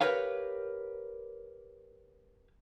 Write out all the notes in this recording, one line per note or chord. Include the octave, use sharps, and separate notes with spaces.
G4 A#4 B4 C#5 F5